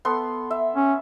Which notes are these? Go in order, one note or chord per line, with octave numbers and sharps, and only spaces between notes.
B3 A4 C6
E5
C#4